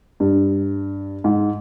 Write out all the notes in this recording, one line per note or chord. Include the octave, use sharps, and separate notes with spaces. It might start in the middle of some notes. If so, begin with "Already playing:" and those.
G2
G#2